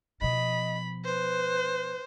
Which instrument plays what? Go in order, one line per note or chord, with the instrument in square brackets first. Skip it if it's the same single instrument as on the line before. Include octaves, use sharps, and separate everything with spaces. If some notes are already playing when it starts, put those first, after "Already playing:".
[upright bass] B2 F3 [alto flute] D#5 [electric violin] B5
[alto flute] B4 [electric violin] C5